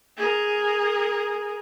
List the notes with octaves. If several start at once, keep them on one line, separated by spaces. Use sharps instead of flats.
G#4 A#4